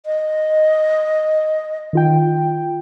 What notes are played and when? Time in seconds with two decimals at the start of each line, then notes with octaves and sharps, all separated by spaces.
0.06 D#5
1.93 D#3 F4 G5